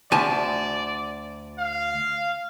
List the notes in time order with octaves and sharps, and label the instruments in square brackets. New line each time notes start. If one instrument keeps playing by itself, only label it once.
[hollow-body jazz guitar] D2 G#5 A5 [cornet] D5
[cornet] F5